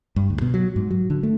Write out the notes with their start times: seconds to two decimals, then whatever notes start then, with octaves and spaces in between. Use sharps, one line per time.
0.16 G2
0.30 D2
0.42 B2
0.54 F#3
0.76 G#2
0.91 F#3
1.10 D3
1.23 A3